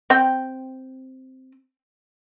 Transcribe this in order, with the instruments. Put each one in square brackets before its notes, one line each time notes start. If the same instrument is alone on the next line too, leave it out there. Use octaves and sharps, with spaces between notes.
[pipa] C4 G5